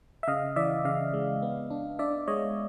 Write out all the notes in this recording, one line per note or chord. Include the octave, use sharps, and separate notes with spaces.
E5
C#3 D#5 F5
E3 D5 E5
C#3 D#5 F5
G#3
B3
D4
D4 D5 E5
G#3 C#5 D#5